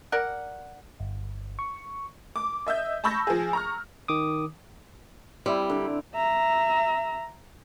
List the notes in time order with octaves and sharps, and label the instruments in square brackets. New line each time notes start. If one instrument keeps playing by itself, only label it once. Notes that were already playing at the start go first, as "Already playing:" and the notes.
[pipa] A#4 D5 F#5
[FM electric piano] G1
C#6
[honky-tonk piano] D6
D#5 E5 E6 G6
A5 B5 C#6 E6 G6 A#6
F3 G#4
A#5 C#6 F6
[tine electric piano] D#3 D6 D#6
[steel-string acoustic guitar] G3 [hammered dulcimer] C4 E4
[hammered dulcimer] D3 D5 A#5
[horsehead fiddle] E5 A#5